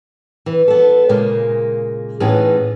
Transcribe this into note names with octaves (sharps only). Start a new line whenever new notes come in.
E3
B3 A4
A#2 C#3 G#3 A#3
A2 E3 B3 C#4 D#4 G#4